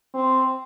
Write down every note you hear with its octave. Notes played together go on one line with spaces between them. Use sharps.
C4